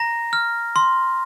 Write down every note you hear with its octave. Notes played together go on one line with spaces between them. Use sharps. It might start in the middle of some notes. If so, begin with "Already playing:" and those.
Already playing: A#5 A#6
F6
C6